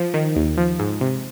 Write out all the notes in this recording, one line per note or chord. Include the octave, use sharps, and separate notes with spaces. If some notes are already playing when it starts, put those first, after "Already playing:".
Already playing: F3
D#3
D#2
F3
G#2
C3